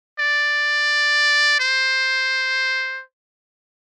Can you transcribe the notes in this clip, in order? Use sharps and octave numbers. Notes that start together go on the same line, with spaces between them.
D5
C5